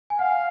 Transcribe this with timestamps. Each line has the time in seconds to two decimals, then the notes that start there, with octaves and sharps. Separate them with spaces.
0.10 G#5
0.19 F5 F#5